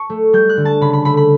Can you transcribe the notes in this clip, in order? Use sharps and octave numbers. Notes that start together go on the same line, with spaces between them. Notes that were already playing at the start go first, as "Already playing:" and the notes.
Already playing: A5 C#6
A3
G3 G6
F#6
D3
A5
C#3 B5
B5
A3 B5
B5